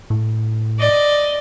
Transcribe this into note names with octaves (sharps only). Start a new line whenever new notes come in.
A2
D5 D#5